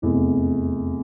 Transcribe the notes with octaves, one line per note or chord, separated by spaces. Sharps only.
F1 E2 C3